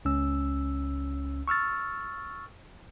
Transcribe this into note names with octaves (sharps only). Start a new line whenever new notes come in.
C#2 C#4 E6
C#6 E6 F6 A6